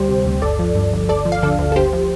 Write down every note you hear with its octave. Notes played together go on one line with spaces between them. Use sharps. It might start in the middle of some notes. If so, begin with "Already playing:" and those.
Already playing: D2 G3 G4 C5
C3
D2
G1 A4 D5
F3
G2
G1
D2 A4 D5
F3
F5
D3 A4 D5
D2
A4
G1 G4 C5
F3